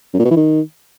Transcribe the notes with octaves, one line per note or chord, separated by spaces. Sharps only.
F#2
A#2
B2
E3
D#3